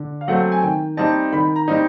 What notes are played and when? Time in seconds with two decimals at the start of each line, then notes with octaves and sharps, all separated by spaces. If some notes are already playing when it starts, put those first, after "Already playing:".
Already playing: D3
0.21 F5
0.28 F#3 A3 C4 F#5
0.52 G#5
0.62 D#3 G5
0.97 G3 C4 D#4 A5
1.33 D#3 B5
1.56 A#5
1.68 G3 C4 D#4